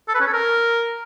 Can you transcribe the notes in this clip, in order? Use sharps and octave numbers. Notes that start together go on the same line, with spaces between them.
A4
B4
C#4
A4
A#4